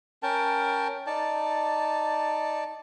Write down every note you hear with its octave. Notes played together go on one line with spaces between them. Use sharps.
C#4 A#4 G5 A5
D#4 D5 A5